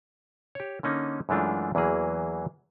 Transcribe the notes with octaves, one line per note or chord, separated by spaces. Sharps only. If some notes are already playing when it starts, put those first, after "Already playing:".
G4 C#5
D3 A#3 C#4 D#4
F#2 E3 G#3 A3 D4 F4
E2 E3 F#3 A#3 G#4